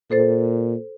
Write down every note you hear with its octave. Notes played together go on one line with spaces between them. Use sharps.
A#2 A4 C5 A6